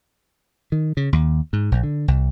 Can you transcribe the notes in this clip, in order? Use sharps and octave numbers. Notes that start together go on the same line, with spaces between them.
D#3
C#3
D#2
G#2
A#1
D3
C2